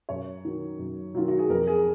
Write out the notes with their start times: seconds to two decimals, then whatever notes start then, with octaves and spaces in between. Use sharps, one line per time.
0.09 F#2 C#5
0.45 D#3 F#3
0.79 F#2
1.15 D#3 F#3 F4
1.28 F#4
1.39 G#4
1.49 F2 A#4
1.67 G#4